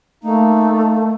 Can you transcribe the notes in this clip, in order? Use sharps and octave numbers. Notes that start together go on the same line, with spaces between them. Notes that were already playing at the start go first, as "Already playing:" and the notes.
A3 A#3 D#4